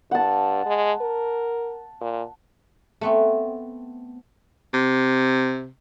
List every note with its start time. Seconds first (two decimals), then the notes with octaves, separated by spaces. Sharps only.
0.11 G2 F#5 A5
0.66 G#3
1.01 A#4
2.01 A#2
3.01 A3 B3 C4
4.74 C3